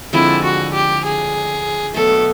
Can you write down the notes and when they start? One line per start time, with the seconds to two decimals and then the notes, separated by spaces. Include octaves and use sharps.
0.13 D3 F3 G#3 C4 E4
0.44 F#4
0.73 G4
1.04 G#4
1.94 B2 F#3 A3 A4